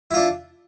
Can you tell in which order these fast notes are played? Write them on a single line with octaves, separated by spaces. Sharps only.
E4 F4 D4